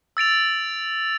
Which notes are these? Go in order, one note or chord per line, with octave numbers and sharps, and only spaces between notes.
E6 A6 D7 F7